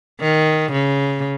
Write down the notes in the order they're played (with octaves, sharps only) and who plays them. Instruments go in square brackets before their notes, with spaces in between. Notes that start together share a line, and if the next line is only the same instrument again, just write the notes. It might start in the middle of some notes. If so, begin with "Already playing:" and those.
[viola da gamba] D#3
C#3